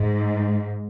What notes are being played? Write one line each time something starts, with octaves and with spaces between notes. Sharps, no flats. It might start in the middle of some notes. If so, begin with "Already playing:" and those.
Already playing: G#2